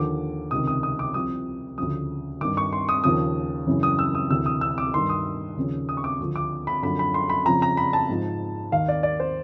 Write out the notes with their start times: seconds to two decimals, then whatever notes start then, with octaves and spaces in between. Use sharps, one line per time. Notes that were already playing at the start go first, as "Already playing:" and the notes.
Already playing: D#2 D3 F3 D6
0.51 C#2 C3 D#3 D#6
0.67 D#6
0.83 D#6
0.99 D6
1.14 C2 C3 F3 D#6
1.78 D2 C#3 F3 D#6
2.41 G2 D#3 D6
2.57 C#6
2.73 C6
2.89 D#6
3.04 D#2 C#3 F3 D#6
3.67 F#2 C#3 E3
3.83 D#6
3.99 E6
4.15 D#6
4.30 D2 C3 E3 E6
4.46 D#6
4.61 E6
4.78 D6
4.94 G2 D#3 C6
5.09 D#6
5.57 D#2 C#3 F3
5.89 D#6
5.97 C#6
6.04 D6
6.20 D2 D3 F3
6.36 D6
6.67 B5
6.82 F#2 D3 F3 B5
6.99 B5
7.14 C6
7.30 B5
7.46 F2 C#3 F3 A#5
7.62 A#5
7.77 B5
7.93 A5
8.09 G#2 F3
8.72 D#2 D#3 F5
8.88 D5
9.03 D5
9.20 C5